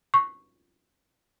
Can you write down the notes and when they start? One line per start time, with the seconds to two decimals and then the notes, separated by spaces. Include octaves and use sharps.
0.14 C#6